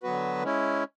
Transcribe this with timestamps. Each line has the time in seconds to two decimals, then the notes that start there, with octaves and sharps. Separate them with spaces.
0.03 D3 F#3 B3 F#4 B4
0.43 G#3 C#4 E4